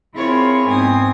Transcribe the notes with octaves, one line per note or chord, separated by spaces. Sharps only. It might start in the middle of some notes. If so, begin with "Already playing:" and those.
C4 E4 F4 G#4 A#4 C#5
G#2 B3 C4 G#5 D#6